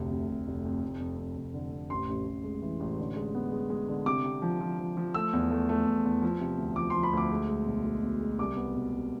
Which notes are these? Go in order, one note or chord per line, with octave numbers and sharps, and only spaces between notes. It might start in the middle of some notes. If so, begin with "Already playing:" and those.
Already playing: F1 D2 C3
C3
F1
F1
F2
F1
F2
F2
F1
D3
F1
A1 C6
A1
A1
G#3
E3
A1
D3
G#3
B3
G#3
G#3
D3
C3 D6
C3
F3
F3
F3
F3
A3 E6
E2
A3
A3
E2
E2
F3
C3
D2
F3 D6
F3 C6
B5
D2 D6
G#3
G#3
B1
G#3
B2
G#3
C2 D6
B3
B2
C2